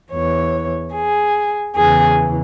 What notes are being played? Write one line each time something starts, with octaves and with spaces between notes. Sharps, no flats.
E2 E3 C#5
G#4
E2 C#3 E3 G#4